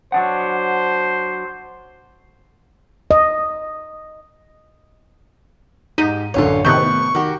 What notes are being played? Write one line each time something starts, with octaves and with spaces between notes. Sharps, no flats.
F#3 D4 C5 F#5
D#5
G#2 D#4 G4 D#7
A1 F#2 D3 F4 G#4 C#5
A2 C3 D#3 A3 B3 C#6 F#6 G6
D#3 F#4 G4